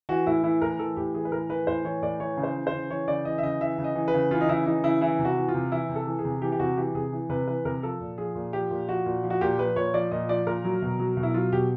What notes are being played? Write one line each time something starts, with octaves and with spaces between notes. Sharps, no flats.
E3 F#4
A2 E4
E3 E4
A2 A#4
E3 A4
A2 G4
E3 G#4
B4
A2 A#4
E3 B4
A2 C5
E3 C#5
A2 D5
E3 C#5
C#3
C5
E3
C5
C#3
E3 C#5
C#3 D5
E3 D#5
E5
C#3 D#5
E3 E5
C#3
D#5
E3
B4
C#3
E3 F4
D#4
C#3 E4
E3 D#4
C#3 E4
E3 E4
C3
F#4
E3
F4
C3
E3 E4
C3
A4
E3
G#4
C3
E3 G4
G4
C3 F#4
E3 G4
C3 G#4
E3
C3 B4
E3 B4
C3 A#4
F3 A4
A#2
F3 G#4
A#2
F3 G4
A#2
F3 F#4
A#2
F3
F#4
A#2 G4
F3 B4
A#2 C#5
F3 D5
A#2 D#5
F3 D5
A#2 A#4
F#3
B2
F#3
B2
E4
F#3 F4
B2 G4